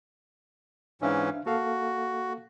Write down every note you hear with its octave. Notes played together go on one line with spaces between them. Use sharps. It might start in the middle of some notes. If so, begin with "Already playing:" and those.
G#2 E3 C#4 D4 E5 F5
A#3 F#4 A4 F5